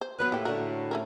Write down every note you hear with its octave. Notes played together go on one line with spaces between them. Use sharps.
C5
D#2 F#3 B3 B4
A2 A#3 E4 G4
D3 F#4 A#4
A3 C#4 A#4